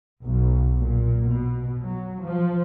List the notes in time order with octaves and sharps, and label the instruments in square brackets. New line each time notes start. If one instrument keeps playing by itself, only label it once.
[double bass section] B1
A#2
B2
F#3
F3